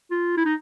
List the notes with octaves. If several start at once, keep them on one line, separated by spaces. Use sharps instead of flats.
F4
E4
D#4